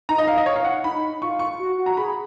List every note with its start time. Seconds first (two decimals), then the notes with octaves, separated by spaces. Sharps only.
0.09 D#4 A#5
0.18 D#5
0.28 F5
0.37 D#5
0.46 C#5
0.56 F5
0.65 F#5
0.84 D#4 B5
1.22 F4 C#6
1.39 C#6
1.59 F#4
1.78 F#4
1.86 A#5
1.97 G#4 B5